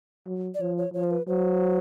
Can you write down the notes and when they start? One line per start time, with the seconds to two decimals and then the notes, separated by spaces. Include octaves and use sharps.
0.27 F#3
0.55 D5
0.60 F3 C#5
0.78 C#5
0.94 F3 C#5
1.04 C5
1.11 B4
1.28 F#3 C5